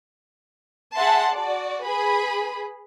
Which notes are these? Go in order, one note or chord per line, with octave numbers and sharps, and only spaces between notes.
G#4 E5 F#5 A5 C6
F#4 D5
G#4 B4 B5